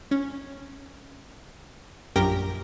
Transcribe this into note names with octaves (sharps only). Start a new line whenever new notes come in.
C#4
A#1 F#2 G4 A#4 G5 A#6